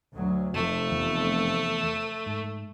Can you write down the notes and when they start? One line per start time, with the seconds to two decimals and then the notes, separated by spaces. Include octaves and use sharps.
0.13 D2 F#3
0.54 F1 F2 A3
0.91 E2
2.26 G#2